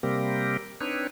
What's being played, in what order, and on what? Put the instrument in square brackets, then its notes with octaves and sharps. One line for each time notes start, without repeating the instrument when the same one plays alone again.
[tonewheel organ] C3 G3 A#3 C4 G4 A#4
C4 D4 D#4 B4 C#5